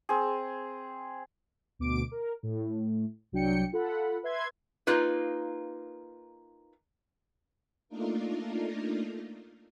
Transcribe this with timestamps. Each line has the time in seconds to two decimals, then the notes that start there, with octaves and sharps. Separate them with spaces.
0.09 C4 G#4
1.79 D2 B2 D6 D7
2.11 A#4
2.43 A2
3.32 C2 F#3 D4 G5 C#7
3.73 F4 A4 F#5 B5
4.23 B4 E5 C6 G#6
4.87 A#3 D#4 F4 B4
7.89 A3 A#3 D4 D#4 F4 A#4